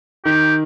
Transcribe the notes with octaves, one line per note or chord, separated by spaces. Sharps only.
D#3 G4